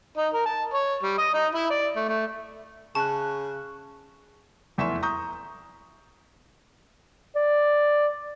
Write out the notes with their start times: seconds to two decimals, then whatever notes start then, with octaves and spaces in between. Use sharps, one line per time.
0.18 D#4
0.34 A#4
0.46 A5
0.74 C#5
1.03 G3
1.18 D#5
1.34 D#4
1.55 E4
1.70 D5
1.96 A3
2.09 A3
2.95 C#3 A5 C#6 F#6
4.78 F1 E2 E5 C6 C#6 E7
5.03 A#5 C#6 D#6 G6
7.36 D5